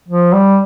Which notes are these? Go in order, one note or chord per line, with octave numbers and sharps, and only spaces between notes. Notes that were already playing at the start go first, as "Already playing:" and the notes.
F3
G3